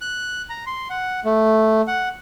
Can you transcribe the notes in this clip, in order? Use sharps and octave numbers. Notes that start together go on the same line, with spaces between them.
F#6
A#5
C6
F#5
A3
F#5